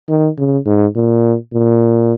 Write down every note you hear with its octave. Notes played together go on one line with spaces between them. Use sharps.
D#3
C#3
G#2
A#2
A#2